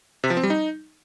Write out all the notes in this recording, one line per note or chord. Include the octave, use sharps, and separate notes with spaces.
C3
F3
C4
G3
D#4